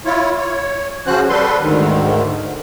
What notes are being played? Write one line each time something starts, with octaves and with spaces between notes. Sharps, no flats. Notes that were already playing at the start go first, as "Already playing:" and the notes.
E4 F4 C#5
C#5
C#3 F3 C#4 F#4 C5 F#6
G3 A4 B4 C6
D2 G#2 D3 D#3